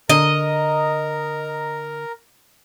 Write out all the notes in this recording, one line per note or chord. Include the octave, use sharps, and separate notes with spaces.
D3 A#4 D#5 A#5